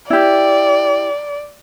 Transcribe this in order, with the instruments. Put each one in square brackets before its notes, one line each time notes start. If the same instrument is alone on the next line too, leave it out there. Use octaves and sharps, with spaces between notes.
[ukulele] E4 G4 [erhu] D5